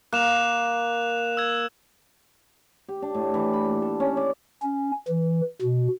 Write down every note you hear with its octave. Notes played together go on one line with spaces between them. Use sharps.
A#3 F#6 E7 F7
E6 G#6
G4
D4
A2
E3
B5
A#2
A4
C#4
D5
C#4
E3
B2